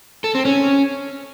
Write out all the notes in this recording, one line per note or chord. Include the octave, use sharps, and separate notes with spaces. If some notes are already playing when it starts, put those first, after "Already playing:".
A4
C4
C#4